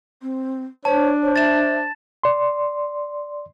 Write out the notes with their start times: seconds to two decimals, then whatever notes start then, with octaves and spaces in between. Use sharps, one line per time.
0.22 C4
0.85 D4 C5 C#5 A5
1.23 C5 C#5
1.36 E5 A6 E7
2.24 D5 C6